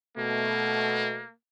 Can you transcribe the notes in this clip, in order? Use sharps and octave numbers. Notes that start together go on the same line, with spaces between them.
B2 A3 A#3